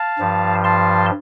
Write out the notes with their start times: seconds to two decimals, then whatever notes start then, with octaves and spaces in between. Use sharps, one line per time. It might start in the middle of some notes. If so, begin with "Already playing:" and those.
Already playing: F5 A5
0.19 G2 F3
0.64 A5 C6